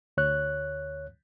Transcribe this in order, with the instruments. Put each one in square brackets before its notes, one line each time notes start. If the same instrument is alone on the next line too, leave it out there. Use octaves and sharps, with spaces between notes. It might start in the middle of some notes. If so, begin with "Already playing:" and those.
[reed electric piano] D2 C#5 F#6